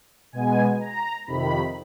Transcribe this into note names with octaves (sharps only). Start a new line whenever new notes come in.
B2 G#3 B3 G#5
A#5
F2 C3 D#3 B5